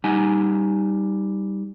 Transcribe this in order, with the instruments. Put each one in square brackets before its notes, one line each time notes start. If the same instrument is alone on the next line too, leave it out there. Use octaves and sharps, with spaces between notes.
[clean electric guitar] G3 D#4 F#5 G#5